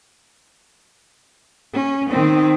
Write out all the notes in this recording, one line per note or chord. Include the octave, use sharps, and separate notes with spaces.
C#4
D#3 C4